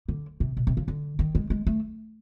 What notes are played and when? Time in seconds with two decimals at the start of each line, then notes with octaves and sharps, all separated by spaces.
0.08 D3
0.40 C3
0.57 B2
0.67 C3
0.77 C#3
0.88 D3
1.19 D#3
1.35 G#3
1.50 G#3
1.67 A3